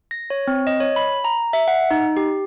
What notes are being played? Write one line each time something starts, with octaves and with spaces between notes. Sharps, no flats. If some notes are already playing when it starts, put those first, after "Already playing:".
A#6
C#5
C4
D#5
C#5
B5
A#5
E5
F#5
D#4
G4